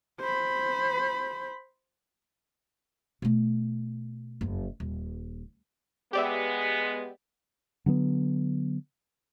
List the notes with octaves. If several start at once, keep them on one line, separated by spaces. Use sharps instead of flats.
C5 B5
B2 A3
F#1 F2
D#1
G#3 B3 G4 D5 E5
D3 F#3 A#3 B3